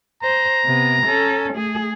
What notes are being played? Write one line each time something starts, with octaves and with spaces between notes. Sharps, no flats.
C5 A#5
C3 B3
C#4 A4
A3 G#4